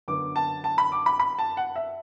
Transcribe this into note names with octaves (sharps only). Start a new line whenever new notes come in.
F#2 D3 B3 D6
A5
A5
B5
D6
B5
B5
A5
F#5
E5